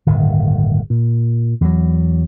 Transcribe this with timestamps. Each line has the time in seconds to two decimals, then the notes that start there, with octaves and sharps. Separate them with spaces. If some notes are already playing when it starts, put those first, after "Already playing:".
0.06 D1 G1 D#3
0.90 A#2
1.61 E2 F#3